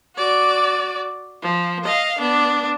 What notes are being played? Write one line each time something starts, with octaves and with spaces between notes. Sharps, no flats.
F#4 D5
F3
D#5 F5
B3 D4